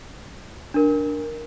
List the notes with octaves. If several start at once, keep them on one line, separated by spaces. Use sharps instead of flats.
D4 A#4